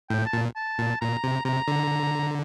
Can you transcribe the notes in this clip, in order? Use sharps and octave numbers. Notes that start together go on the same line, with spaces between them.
A2 G5
A5
A#2
A5
A#2
A#2 A#5
C3
C3 A#5
D3